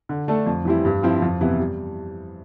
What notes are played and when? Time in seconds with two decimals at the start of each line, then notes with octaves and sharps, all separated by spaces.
0.09 D3
0.28 A3 D4 A4
0.46 F2
0.65 E3 G3 C4 E4
0.85 G2
1.03 F3 C4 E4
1.22 F2
1.41 C3 E3 B3 E4
1.59 G3